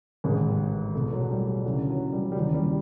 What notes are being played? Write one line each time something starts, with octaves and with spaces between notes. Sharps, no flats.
A1 G#2 D#3 G#3
E1 E2 B2 A3
F#3
G3
G3
D2 C#3 E3 F#3
F#3
G3
G3
D#2 C#3 E3 F#3
F#3
G3